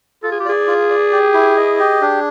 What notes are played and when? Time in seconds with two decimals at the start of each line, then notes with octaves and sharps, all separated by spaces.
0.23 F4 A4
0.31 G#4
0.40 G4
0.45 G#4 D5
0.67 F4
0.90 D5
1.12 G4
1.34 E4
1.57 D#5
1.79 G4
2.01 D4 G#4